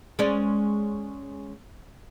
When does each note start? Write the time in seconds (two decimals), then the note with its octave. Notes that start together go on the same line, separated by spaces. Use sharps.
0.19 G#3 C#4 D5